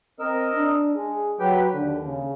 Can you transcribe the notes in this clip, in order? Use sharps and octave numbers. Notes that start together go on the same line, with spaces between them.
C4 A#4 D#5 E6
D4
G#3 G#4
F#3 G4 B4 G5
D#2 D3
C#3